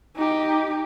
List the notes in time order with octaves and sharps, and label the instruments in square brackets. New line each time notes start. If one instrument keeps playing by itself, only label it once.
[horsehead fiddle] D#4 G4